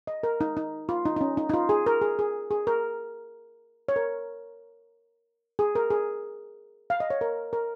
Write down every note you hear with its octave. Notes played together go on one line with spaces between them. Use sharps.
D#5
A#4
D#4
D#4
F4
D#4
D#4
C#4
D#4
D#4
F4
G#4
A#4
G#4
G#4
G#4
A#4
C#5
A#4
G#4
A#4
G#4
F5
D#5
C#5
A#4
A#4